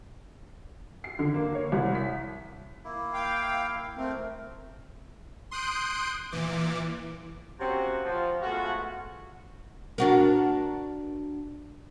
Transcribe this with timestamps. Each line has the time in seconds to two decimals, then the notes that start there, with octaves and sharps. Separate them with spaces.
1.04 C7
1.19 D3
1.34 A#3
1.55 C#5
1.72 C2
1.95 B6
2.85 A#3 E4
3.14 F5 G5
3.97 A3 C4 A#4
5.51 C6 D#6 F#6 G6 D7
6.31 A#2 E3 D6
7.59 C3 A#3 C4 C#4 F#4
8.03 F3
8.42 G#3 A3 B3 F4 F#4
9.98 D4 F#4 A#4